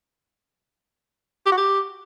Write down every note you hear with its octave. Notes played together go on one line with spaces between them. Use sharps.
G4
F#4
G4